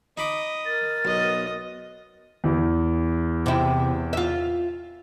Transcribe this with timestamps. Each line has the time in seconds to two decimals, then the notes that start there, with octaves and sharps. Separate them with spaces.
0.17 D#4 D#5 B5 D6
0.66 A#4 A6
1.05 B1 B3 D#5
2.44 E2 E3
3.46 C3 E4
4.13 F4 E5